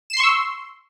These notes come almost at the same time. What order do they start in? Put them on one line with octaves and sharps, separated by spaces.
E7 C7 C6 C#6 E6